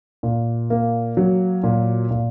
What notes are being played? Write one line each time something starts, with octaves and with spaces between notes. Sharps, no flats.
A#2
A#3
F#3
A#2
A#2